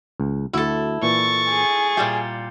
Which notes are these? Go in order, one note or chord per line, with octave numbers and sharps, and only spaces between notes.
C#2
D2 E4 F#4 A4
A#2 E3 C#6 A6
G#4
A#2 G3 G4 E5